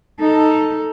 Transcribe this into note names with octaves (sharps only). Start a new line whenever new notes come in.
D#4 A4